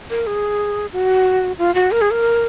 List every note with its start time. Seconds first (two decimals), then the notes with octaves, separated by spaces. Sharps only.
0.10 A#4
0.27 G#4
0.93 F#4
1.59 F4
1.75 F#4
1.92 A#4
2.01 G#4
2.11 A#4